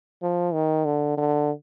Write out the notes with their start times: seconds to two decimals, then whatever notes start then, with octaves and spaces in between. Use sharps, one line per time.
0.23 F3
0.54 D#3
0.85 D3
1.18 D3